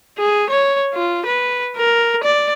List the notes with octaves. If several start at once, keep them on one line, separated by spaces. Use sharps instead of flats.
G#4
C#5
F4
B4
A#4
D5